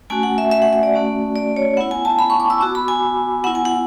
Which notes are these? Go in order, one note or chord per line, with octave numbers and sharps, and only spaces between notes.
A3 C#4 F#4 G#5
F#5
E5
E5
F#5
E5
D5
A3 C#4 F#4
D5
C#5
B3 E4 F#5
G#5
A5
B5
C#6
D6
E6
B3 F#4 D6
B5
G#5
B3 E4 F#5
G#5
F#5